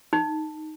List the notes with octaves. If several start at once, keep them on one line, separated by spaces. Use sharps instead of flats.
D#4